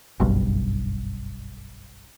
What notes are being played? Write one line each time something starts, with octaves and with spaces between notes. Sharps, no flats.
F#1 B1 G2